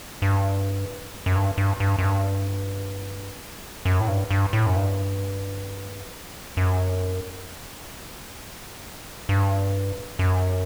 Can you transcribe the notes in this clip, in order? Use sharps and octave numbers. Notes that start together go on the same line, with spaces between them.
G2
F#2
G2
G2
G2
F#2
G2
F#2
A2
G2
G2
A2
F#2
G2
F#2
G2
F#2